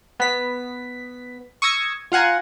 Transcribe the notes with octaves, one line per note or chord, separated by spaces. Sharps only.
B3 B6
C#6 D#6 E6 G#6 A#6
F4 F5 F#5 G#5 A#5